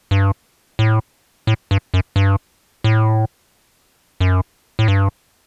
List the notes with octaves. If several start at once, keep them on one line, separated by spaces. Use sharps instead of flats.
G2
A2
A2
G2
F#2
G2
A2
F#2
A2
G2